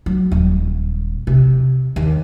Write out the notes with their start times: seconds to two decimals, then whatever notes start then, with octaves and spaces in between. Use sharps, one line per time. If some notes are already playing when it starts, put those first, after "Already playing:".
0.06 F#3
0.32 D#1
1.27 C3
1.96 D#2